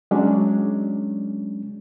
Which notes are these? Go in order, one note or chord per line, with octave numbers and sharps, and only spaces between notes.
F#3 G#3 C#4 D4